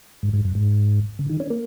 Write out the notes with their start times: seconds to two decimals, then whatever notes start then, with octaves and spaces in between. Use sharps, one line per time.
0.23 G#2
0.33 G#2
0.45 F#2
0.55 G#2
1.19 C#3
1.30 D#3
1.40 C#4
1.50 A#3